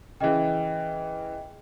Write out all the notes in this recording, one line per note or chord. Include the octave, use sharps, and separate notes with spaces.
C#3 E3 G#4 D#5 G5